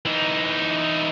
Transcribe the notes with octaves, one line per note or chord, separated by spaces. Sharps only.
E3 D#4